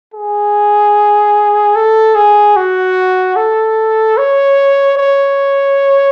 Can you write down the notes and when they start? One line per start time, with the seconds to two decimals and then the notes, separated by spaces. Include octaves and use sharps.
0.14 G#4
1.76 A4
2.15 G#4
2.56 F#4
3.36 A4
4.18 C#5
4.98 C#5